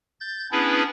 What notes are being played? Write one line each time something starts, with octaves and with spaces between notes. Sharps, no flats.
G6 A6
B3 C#4 D4 E4 G#4 B4